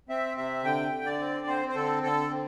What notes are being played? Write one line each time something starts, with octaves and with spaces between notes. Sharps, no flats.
C4 E5
C3 E5
D3 G5
D3
D5
C4
C4 C5
C5
D3 A4
D3 A4
C4